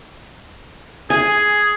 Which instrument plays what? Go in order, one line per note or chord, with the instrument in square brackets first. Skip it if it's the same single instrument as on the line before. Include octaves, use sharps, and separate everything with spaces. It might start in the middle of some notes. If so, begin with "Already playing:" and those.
[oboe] G#4 [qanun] G#5